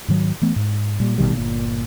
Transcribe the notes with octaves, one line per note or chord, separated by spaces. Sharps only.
G#2 D#3 F#3
E3 A3 B3
G#2
A#2 G3
A1 B2 D#3 G3
G1 A#2